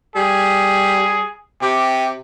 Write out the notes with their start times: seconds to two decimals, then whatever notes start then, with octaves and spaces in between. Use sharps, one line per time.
0.16 G3 G#4
1.62 C3 G4